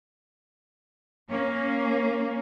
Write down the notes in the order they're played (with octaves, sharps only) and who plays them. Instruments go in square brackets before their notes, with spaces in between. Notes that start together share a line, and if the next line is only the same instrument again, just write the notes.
[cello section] A#3 C#4